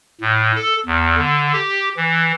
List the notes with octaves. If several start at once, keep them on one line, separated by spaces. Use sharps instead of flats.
A2
A4
E2
D3
G4
E3